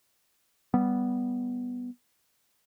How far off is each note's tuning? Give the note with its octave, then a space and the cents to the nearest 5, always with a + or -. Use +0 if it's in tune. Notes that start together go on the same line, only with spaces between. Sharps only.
G3 +0 B3 +0